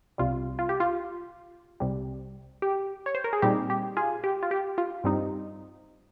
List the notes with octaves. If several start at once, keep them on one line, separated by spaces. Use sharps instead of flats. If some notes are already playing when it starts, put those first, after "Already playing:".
C2 C3 G3 F4
F4
G4
F4
C2 C3 G3
G4
C#5
C5
A#4
G#4
A#2 G3 C4 D#4 G4
G4
F4 G#4
G4
F4
G4
F4
G2 G3 C4 D#4